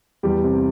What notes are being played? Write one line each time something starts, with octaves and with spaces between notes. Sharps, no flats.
E2 G3 G4
C3